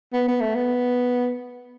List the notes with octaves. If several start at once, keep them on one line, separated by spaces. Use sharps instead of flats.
B3
B3
A3
B3